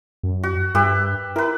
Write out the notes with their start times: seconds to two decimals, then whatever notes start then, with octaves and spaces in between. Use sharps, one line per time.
0.23 F#2
0.43 F#4
0.75 G2 G4 B4 E5
1.36 E4 A#4 B4